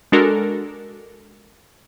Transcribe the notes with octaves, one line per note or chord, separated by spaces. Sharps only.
G#3 D4 F#4 A4 A#4